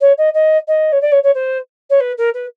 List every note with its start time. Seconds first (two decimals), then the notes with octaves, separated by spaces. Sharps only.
0.01 C#5
0.18 D#5
0.34 D#5
0.68 D#5
0.92 C#5
1.01 D5
1.12 C#5
1.23 C#5
1.35 C5
1.90 C#5
2.00 B4
2.18 A#4
2.34 B4